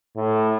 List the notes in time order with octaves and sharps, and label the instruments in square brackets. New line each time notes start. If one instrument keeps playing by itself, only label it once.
[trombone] A2